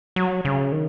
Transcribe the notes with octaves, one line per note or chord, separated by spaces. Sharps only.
F#3
C#3
D#3